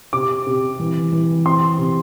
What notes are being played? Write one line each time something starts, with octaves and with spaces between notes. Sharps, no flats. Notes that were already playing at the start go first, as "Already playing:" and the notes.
C3 D6
C3
E3
E3
C4 C6
C3